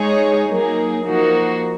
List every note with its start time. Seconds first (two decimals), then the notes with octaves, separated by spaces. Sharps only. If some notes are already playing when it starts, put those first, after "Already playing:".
Already playing: G#3 D#4 G#4 C#5
0.50 F#3 A#3 D#4 G#4
1.06 F3 A#3 D#4 F#4